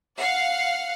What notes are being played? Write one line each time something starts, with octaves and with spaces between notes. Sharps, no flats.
F5 F#5